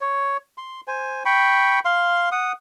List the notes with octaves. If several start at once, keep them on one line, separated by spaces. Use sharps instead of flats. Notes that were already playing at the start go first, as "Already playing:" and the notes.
C#5
C6
C5 G#5
G5 B5 C#6
F5 C6
F#5 D#6